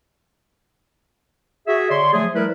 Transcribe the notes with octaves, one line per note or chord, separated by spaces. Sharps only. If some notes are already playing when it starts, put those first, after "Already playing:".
F#4 G#4 E5
D3 C#5 D5 C6
F3 F#3 A3 G#4
F3 G3 A3 E4 A#4 B4